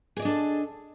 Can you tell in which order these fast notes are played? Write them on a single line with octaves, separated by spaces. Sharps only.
G#4 D5 D#5 D4 A4